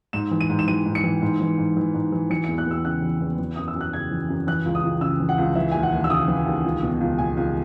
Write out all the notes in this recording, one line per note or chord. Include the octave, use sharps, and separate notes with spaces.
G#2 E7
E3
D#7
G#2
E7
E3 D#7
G#2
C#7
E3
G#2
E3
G#2
E3
G#2
E3
E3 C#7
C#7
E2
F#6
E2 E6
C#3 F#6
E3
E2
E3
F#2 D#6
E6
F#2
F#6
C#3 G#6
E3
F#2
E3 F#6
C#2
D#6
C#2
C#3 E6
E3
F#5
C#2
E3 E5
D#2 G#5
F#5
D#2
E6
C#3 D#6
E3
D#2
C#2
B2
C#2
B2 G#5
C#2